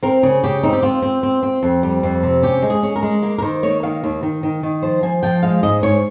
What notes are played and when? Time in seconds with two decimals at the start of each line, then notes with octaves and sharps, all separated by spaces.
0.03 C4 A#4
0.23 C#3 G#4
0.44 C#3 G4
0.63 C4 D#4
0.73 G4
0.83 C4 F4
1.02 C4
1.23 C4
1.43 C4
1.63 F2
1.83 G3
2.03 F2
2.23 C3
2.43 C#4 G4
2.62 G#3
2.70 G#4
2.83 C#4
2.96 A#4
3.03 G#3
3.22 A#3 A#4
3.38 A#4
3.42 D#3 C5
3.63 A#3 C#5
3.83 D#3 F5
4.04 D#2
4.23 D#3
4.43 D#3
4.63 D#3
4.82 F3 C5
5.03 F3 G#5
5.23 F3 G5
5.43 G#3 F5
5.63 G#2 D#5
5.83 G#2 C#5